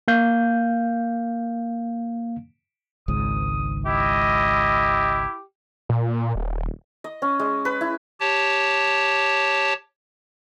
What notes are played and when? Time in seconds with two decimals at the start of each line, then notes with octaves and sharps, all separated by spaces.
0.08 A#3 F5 G6
3.08 G#1 C#2 G#2 D#6
3.86 E4 G4 D#5
5.89 A#2
6.35 D#1
7.04 D#5
7.22 C#4
7.39 G#3
7.65 B4
7.81 E4
8.20 G4 C#5 A5